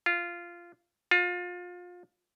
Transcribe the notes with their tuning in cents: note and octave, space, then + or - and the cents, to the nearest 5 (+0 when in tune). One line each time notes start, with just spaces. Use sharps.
F4 -10
F4 +30